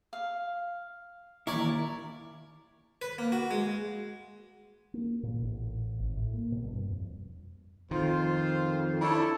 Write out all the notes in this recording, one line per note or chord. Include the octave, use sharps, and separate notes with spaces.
F5
D#2 E4 A#4 C#5 D5
B4
A#3
F#4
G#3
A#3
A#2
A1
G#1
A2
A#3
B2
G2
F2
F2 D#3 F4 C5
D4 E4 A4 C#5